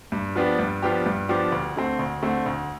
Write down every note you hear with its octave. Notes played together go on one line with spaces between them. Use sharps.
G2
F3 B3 D4 G4
G2
F3 B3 D4 G4
G2
F3 B3 D4 G4
D2
D3 A3 C4
D2
D3 A3 C4
D2